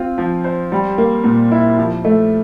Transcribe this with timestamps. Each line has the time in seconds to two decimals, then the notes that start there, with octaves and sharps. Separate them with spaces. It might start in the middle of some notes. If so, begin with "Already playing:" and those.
Already playing: C4 F4
0.18 F3
0.44 C5
0.72 G3
0.98 A#3
1.24 A#2
1.51 E4
1.78 F3
2.05 A3